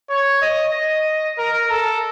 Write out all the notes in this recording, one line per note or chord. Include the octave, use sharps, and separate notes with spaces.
C#5
D#5
D#5
A#4
A4